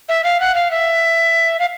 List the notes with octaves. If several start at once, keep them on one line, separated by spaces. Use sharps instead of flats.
E5
F5
F#5
F5
E5
F5